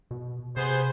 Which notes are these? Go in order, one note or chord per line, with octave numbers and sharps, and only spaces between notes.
B2
C3 B3 G#4 C5